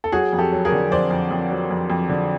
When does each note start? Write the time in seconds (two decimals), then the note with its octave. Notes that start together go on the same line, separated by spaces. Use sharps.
0.04 A4
0.12 F#3 F#4 G#4
0.33 F2
0.39 G4 A4
0.52 F#3
0.65 G#4 A#4
0.72 D3
0.91 F2 C5 D5
1.11 F2
1.31 F2
1.51 F#3
1.71 F2
1.90 F2
2.09 D3